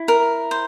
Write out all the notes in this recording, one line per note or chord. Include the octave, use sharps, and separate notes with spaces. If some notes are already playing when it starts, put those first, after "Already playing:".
Already playing: E4
A#4
C5